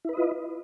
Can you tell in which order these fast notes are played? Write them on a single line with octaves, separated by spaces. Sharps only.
E4 B4 D#5 F4